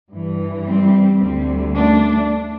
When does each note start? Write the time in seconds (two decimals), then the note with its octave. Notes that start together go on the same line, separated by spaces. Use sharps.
0.10 G2 E3
0.66 G3 C4
1.21 D2 D3 G3 C4
1.76 A3 D4